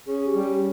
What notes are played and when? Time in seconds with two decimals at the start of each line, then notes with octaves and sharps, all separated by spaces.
0.07 C#4 G#4
0.27 G4
0.35 G3
0.45 G4